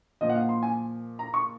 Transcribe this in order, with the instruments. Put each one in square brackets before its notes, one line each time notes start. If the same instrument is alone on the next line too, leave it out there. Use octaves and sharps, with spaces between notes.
[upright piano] A#2 F3 D#5
F#5
F5
C6
G#5
A#5
C#6